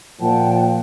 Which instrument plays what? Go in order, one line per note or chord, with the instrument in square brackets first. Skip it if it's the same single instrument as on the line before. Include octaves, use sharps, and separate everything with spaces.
[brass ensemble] A#2 F3 [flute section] F#5 G5 A5